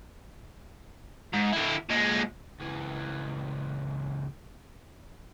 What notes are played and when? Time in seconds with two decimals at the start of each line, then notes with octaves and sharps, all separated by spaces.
1.33 G#2
1.53 D3 E4
1.90 A#2 G#3
2.60 C#2 E3